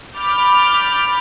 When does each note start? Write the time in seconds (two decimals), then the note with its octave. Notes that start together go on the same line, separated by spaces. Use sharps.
0.18 B5 D6 F6 G6 A6